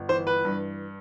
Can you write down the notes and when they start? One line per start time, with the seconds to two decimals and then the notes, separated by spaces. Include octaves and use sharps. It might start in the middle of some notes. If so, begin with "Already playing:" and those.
Already playing: G1
0.09 E3 C5
0.27 B4
0.45 G2